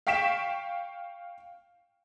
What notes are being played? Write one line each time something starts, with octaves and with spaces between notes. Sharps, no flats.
F5 G5 C#6 B6 D7 E7